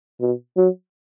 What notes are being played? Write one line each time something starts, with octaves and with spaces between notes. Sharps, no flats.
B2
F#3